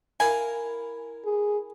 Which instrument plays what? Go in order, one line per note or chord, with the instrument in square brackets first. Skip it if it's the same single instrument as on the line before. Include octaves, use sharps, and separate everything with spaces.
[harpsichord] E4 A#4 F5 [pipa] G#5
[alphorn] G#4